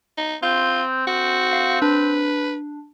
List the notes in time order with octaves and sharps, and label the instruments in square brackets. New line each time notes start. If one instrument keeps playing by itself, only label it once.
[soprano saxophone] D#4
[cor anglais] C4 [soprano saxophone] F4 [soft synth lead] G6
[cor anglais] C4 [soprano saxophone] F#4
[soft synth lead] F5
[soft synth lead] D4 [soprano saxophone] B4